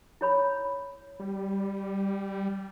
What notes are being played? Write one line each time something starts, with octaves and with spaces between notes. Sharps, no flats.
E4 C#5 B5
G3